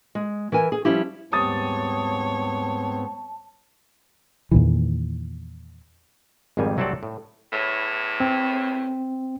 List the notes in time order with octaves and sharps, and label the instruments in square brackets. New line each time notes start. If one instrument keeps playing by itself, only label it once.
[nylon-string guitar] G#3
E3 A#4 G#5
G#4
F3 G3 C#4 E4 G4
[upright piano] D#1 D#6 A6 [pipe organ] G#2 B3 C4 [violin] C#5 [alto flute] A5
[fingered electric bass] E2 A#2 D#3 E3
[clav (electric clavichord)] G#1 F2 G#2 D#3 G3 G#5
C2 F#3 A3 C4 A4 D5
A2
[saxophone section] E2 A2
[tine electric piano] C4